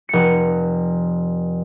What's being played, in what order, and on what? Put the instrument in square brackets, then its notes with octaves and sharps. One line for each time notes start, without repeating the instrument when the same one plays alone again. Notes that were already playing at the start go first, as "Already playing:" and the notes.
[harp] F1 C#7